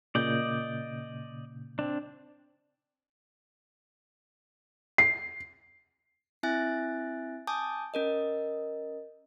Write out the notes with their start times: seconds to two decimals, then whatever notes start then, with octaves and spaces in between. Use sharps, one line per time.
0.15 A#2 C#3 D5 D#5 G6
1.79 C4 D4
4.98 C7
6.43 C4 E4 E5 G#5 F#6 A6
7.47 G#5 A5 D6 D#6 G6
7.94 C#4 A#4 D#5